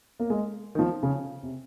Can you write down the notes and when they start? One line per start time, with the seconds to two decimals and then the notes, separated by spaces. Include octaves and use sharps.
0.20 A#3
0.30 G#3
0.75 D#3
0.79 F3
1.03 C#3
1.43 C3